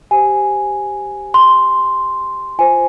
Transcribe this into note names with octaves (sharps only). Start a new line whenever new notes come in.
G4 C5 G#5
C6
F4 C5 G#5